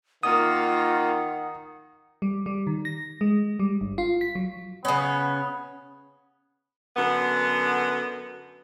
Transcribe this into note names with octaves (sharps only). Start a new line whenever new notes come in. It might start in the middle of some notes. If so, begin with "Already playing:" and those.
D#3 A#3 F4 F#5 D#6
G3
G3
D#3
A#6
G#3
G3
G1
F4
B6
F#3
C#3 B3 C#4
F#2 D3 B3